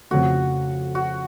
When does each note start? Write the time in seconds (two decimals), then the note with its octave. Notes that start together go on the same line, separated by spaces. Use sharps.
0.11 F2 C#3 F3 A3 F#4
0.95 F#4